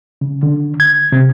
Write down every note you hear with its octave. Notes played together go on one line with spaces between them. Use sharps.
C#3
D3
G#6
C3